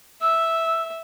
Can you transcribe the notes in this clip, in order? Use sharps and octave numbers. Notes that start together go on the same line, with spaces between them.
E5 E6